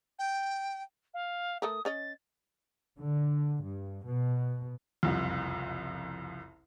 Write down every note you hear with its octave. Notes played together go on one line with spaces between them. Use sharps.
G5
F5
A3 A4 A#4 D#6
C#4 C#5 D#5 A6
D3
G2
B2
F#1 C2 F2